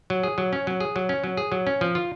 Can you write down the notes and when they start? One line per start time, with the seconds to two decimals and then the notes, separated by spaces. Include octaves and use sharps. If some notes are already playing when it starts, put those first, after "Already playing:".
0.10 F#3
0.23 G#4
0.38 F#3
0.53 C#4
0.67 F#3
0.80 G#4
0.96 F#3
1.09 C#4
1.24 F#3
1.37 G#4
1.52 F#3
1.67 C#4
1.81 F3
1.95 F4